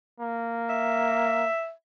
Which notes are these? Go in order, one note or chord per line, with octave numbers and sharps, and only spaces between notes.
A#3
E5